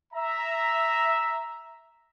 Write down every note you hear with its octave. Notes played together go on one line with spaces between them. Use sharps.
E5 A#5